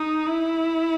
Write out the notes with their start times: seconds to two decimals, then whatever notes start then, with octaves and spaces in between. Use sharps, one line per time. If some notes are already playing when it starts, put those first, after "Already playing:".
Already playing: D#4
0.26 E4